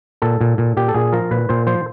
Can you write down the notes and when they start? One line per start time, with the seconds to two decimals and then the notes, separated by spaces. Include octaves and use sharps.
0.22 A#2 A4
0.41 A#2
0.58 A#2
0.77 A#2 G4
0.88 A4
0.94 A#2 G#4
1.13 F3 A#4
1.31 A#2 B4
1.49 A#2 C5
1.67 F3 C5